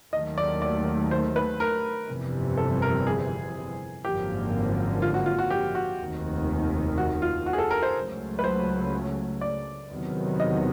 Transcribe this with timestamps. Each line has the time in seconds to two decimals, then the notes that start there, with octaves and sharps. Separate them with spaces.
0.13 D#2 D#3 F#3 A3 D#5
0.38 D5
0.62 D5
1.11 C5
1.36 B4
1.60 A#4
2.08 G1 F2 C3 E3 G3
2.58 A4
2.82 A#4
3.07 G#4
4.04 G#1 F#2 D3 F3 A#3 G4
5.02 F4
5.14 F#4
5.26 F4
5.39 F#4
5.50 G4
5.75 F#4
6.00 F1 D#2 D#3
6.98 F#4
7.22 F4
7.46 F#4
7.53 G#4
7.58 A4
7.71 A#4
7.83 C5
7.95 C#2 C#3 F#3 A3
8.39 B4
8.44 C5
9.41 D5
9.91 E2 C3 D#3 F#3 B3
10.40 D#5